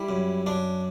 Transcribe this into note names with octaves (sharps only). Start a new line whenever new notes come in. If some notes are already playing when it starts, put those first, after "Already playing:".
Already playing: G3 E4
F#2
F#2 D4